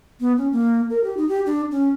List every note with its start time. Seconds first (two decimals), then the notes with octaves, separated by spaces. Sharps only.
0.20 B3
0.37 C#4
0.52 A#3
0.90 A#4
1.04 G4
1.17 D#4
1.29 G4
1.46 D4
1.71 C#4